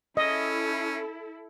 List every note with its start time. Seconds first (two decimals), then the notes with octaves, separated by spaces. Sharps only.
0.17 C#4 E4 A4 D#5